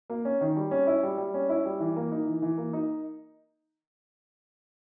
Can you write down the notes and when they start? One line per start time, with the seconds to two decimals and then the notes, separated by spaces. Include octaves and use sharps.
0.10 A#3
0.25 C#4
0.41 D#3
0.56 G3
0.71 C#4
0.87 E4
1.03 G3
1.18 G3
1.34 C#4
1.49 E4
1.65 G3
1.80 E3
1.96 A#3
2.12 D#4
2.27 E3
2.42 E3
2.58 A#3
2.73 D#4